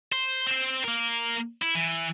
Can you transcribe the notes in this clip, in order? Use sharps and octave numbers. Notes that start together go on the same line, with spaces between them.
C5
C4 C5
A#3 A#4
E4
E3